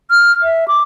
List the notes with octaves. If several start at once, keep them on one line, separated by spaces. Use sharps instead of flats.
F6
E5
D6